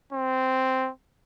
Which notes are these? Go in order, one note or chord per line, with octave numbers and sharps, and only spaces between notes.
C4